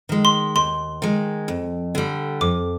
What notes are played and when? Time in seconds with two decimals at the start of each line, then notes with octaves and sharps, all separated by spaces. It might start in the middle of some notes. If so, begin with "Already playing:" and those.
0.09 D#3 G#3
0.25 C6
0.56 D#2 C6
1.02 D#3 G#3
1.48 F2
1.95 D3 G3
2.41 F2 D6